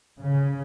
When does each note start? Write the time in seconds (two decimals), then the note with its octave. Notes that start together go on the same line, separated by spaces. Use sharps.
0.19 C#3